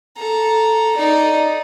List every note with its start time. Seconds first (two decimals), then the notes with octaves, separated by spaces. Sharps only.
0.17 A4 A#5
0.96 D#4 D5